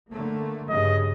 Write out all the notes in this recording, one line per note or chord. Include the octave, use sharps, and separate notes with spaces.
D3 A3 A#3
G2 C#3 D#5